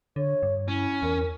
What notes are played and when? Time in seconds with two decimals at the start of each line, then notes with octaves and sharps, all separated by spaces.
0.16 D3 C#5
0.43 G2
0.68 C#4 E4
1.02 E2 A#4